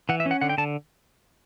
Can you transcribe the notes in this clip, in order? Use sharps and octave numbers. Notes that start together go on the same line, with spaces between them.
E3 F#5
E5
C#4
F#5
D3 F#5
G5
D3 A5